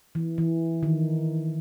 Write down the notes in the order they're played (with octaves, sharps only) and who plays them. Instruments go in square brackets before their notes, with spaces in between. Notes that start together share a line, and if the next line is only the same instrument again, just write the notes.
[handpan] E3
E3
D#3